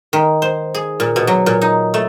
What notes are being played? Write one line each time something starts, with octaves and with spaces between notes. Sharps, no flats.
D#3
C5
G#4
A#2
B2
F#3
A#2
D#4
A3